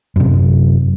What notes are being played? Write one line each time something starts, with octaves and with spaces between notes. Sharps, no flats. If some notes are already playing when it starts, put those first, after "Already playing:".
F#2 C3